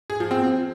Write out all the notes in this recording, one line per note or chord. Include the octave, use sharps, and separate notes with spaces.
G#4
F3
C4